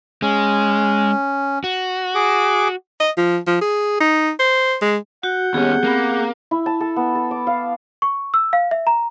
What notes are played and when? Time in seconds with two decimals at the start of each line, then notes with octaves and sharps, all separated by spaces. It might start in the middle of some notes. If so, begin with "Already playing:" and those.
0.22 G#3 C#4
1.64 F#4
2.15 G#4 D6
3.00 D#5
3.17 F3
3.47 F3
3.61 G#4
4.00 D#4
4.40 C5
4.82 G#3
5.23 F#4 F#5 G6
5.54 D#2 B3 C#4 G4 G#4
5.84 A#3 C4 B5
6.51 E4
6.66 A5
6.81 A4
6.96 B3
7.15 A4
7.31 D6
7.47 F5
8.02 C#6
8.34 E6
8.53 F5
8.71 E5
8.87 A#5